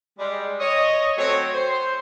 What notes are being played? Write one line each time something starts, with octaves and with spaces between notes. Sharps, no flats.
G3 G#3
C#5 D#5
F#3 A3 C4 C#5
C5